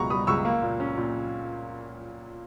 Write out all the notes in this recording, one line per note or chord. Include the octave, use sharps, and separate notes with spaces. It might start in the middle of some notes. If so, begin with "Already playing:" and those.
Already playing: C#2 B2 A#5 C#6
G3 B5 D#6
C#2 C#6 E6
A#3
A#2
C#4
A#2